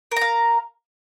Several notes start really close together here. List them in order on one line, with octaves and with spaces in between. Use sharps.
A#4 A#5 F5